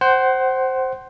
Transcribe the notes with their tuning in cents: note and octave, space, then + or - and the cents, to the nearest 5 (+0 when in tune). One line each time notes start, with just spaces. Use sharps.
C5 +5 F#5 +30